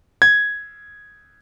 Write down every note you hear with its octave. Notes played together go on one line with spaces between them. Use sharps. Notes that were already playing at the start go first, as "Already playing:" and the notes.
G#6